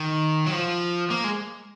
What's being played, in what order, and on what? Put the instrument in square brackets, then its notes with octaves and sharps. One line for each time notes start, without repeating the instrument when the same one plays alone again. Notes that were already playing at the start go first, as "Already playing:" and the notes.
Already playing: [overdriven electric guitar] D#3
F#3
F3
A#3
G#3